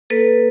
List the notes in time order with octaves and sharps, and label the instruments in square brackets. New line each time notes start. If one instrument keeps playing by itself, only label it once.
[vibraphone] A#3 A4 B4